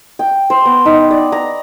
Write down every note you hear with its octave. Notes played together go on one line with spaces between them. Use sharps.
G5
C5
B3
D#4
D5
A#5